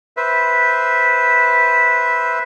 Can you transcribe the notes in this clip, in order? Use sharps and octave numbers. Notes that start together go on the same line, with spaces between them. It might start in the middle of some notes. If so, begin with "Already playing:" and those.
B4 C5 E5